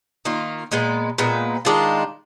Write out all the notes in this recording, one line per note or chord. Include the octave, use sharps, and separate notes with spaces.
D#3 A#3 F4
A#2 G#3 B3
A#2 G#3 B3
D#3 G#3 D4 F4